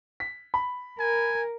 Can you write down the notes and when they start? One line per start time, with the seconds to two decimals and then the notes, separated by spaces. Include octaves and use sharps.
0.20 B6
0.54 B5
1.00 A#4 G#5